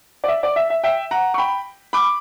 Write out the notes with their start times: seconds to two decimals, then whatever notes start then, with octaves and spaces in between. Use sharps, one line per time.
0.24 D5
0.28 E5
0.43 D5
0.56 E5
0.70 E5
0.84 E5 G5
1.11 F#5 A#5
1.34 C#6
1.38 G5 B5
1.93 B5 D6